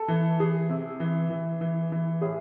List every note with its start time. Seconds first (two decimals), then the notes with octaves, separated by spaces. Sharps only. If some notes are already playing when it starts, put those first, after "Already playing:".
Already playing: A4
0.08 E3
0.40 E3 G#4
0.69 C3
1.00 E3
1.30 E3
1.61 E3
1.92 E3
2.21 A2 G#4